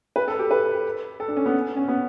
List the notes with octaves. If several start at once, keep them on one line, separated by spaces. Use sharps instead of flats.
B4
A4
G4
B4
A4
D4
C#4
B3
C#4
B3